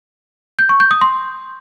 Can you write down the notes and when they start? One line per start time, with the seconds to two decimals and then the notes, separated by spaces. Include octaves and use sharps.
0.59 G6
0.69 C#6
0.80 G6
0.91 D#6
1.01 C6